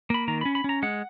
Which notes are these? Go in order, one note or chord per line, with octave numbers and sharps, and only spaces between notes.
A#3 B5
D#3 A#5
C#4 B5
B5
C#4 A#5
G#3 F#5